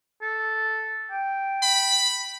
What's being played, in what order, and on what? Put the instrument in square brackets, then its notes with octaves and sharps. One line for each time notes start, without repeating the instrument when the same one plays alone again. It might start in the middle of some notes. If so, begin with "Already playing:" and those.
[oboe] A4
G5
[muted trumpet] B5